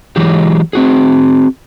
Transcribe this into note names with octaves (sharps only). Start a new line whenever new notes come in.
E3 F#3 G#3 G4
C4 F#4 G#4